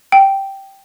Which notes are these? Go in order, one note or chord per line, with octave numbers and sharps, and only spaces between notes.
G5